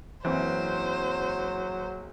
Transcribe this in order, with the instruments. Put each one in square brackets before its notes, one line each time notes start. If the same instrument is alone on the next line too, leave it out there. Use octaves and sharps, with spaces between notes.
[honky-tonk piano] F#1 C4 [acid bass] E3 [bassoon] F#3 [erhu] C5